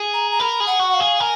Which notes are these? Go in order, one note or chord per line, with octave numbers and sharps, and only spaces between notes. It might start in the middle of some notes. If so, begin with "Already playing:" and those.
Already playing: G#4
A#5
A#5
A#4 B5
G#4
F#5
F#4
F5
G#4
A#4 G#5